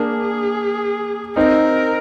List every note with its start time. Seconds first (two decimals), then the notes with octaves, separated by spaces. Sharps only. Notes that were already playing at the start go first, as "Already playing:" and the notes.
Already playing: A#3 D4 G#4
1.36 C4 D#4 A#4